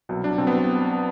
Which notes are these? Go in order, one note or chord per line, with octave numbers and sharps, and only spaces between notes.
C2 B2 F#3
D4
C2 B2 F#3 C4
B3